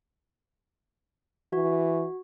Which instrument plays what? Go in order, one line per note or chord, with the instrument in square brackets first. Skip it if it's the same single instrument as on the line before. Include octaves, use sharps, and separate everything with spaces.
[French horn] E3 [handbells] F#4